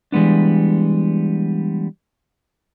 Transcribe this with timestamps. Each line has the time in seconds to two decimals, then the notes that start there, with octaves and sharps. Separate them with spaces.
0.12 E3 G3 G#3 B3 D4